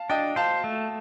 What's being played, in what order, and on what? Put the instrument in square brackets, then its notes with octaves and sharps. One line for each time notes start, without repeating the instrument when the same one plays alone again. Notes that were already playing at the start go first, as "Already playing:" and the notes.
Already playing: [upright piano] F5 A5
[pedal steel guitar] D4 [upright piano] D#5 G5
[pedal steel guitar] C5 [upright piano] F5 A5
[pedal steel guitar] A3